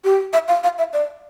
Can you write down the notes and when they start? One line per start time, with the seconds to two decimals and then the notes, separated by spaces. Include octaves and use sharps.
0.04 G4
0.33 E5
0.48 F5
0.63 F5
0.78 E5
0.93 D5